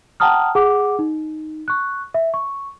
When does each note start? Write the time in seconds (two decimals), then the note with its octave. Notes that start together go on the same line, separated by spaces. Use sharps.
0.20 F#5 G5 A5 A#5 D#6 F6
0.55 G#4 F#5 D6
0.99 D#4
1.68 C#6 F#6
2.14 E5
2.34 C#6